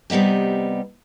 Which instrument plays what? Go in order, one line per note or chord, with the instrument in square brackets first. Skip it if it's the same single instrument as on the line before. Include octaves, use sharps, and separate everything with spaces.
[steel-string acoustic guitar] C3 G3 B3 D#4 G4